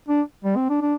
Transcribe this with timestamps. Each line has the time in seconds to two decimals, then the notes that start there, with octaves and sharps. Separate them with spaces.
0.08 D4
0.44 G3
0.56 C4
0.70 D4
0.81 D4